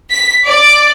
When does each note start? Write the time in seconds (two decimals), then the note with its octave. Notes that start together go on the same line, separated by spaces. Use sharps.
0.11 B6
0.46 D5